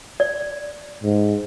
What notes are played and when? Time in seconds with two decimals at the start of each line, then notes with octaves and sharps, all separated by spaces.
0.20 D5
1.04 G#2